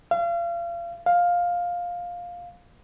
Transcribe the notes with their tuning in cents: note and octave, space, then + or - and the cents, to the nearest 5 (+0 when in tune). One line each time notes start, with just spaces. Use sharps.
F5 -35
F5 +10